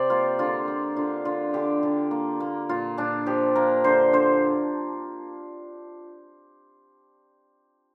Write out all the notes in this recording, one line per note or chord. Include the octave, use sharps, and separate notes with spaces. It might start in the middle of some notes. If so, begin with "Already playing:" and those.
Already playing: C3 G4 C5 D5
A#3 F4
D3 F4
A#3
D3 F4
D3 F4
D3 G4
D3
A#3
A#3
A#2 F4
A#2 D4
F3 G4
A#3 A#4
D3 C5
D3 C5